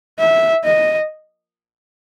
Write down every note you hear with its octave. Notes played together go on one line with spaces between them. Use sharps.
E5
D#5